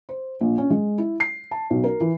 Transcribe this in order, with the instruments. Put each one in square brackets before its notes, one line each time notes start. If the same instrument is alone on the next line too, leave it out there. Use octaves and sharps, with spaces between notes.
[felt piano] C5
A#1
C#4
G#3
E4
C7
A5
B1
A#4
E3